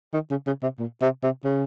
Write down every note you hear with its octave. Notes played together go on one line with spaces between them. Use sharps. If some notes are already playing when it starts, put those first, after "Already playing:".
D#3
C#3
C#3
C3
A#2
C3
C3
C#3